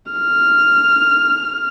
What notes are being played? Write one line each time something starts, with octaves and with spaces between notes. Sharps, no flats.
F6